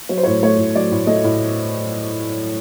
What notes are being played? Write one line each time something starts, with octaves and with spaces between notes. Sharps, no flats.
F#3 C#5
C5
A2 C#5
A3 C#5
A2
F#3 D5
A2
A3 D#5
A2